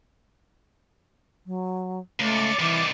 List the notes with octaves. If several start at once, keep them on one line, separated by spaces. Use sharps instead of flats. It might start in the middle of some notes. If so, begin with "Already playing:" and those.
F#3
C#2 A3 D6 A6 C#7
C2 D#3 E3